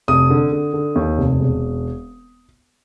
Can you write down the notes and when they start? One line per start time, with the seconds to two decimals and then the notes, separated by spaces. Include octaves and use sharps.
0.08 F1 D#6
0.30 D3
0.52 D3
0.74 D3
0.95 D#2
1.18 F1
1.39 E1